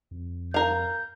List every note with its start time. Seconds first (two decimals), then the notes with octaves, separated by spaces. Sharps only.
0.11 F2
0.54 A#4 F5 G6